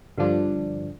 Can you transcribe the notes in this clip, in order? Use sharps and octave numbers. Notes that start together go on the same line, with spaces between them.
G2 D3 F3 D4